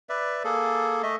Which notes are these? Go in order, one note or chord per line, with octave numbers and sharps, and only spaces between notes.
B4 D5 E5
A#3 G#4 A4
A3 D#5 E5